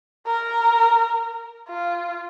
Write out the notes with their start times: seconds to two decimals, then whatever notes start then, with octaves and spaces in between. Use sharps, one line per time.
0.27 A#4
1.69 F4